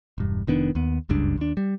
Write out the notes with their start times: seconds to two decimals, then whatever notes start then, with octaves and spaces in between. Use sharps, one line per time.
0.18 E1 G2
0.47 F1 D#3 B3 D4
0.75 D#2 B3
1.09 F#1 C#2 G2 D4
1.38 D#2 D4
1.57 G3